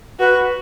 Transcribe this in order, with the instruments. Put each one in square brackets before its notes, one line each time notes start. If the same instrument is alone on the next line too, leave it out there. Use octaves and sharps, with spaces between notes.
[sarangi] F#4 [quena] B4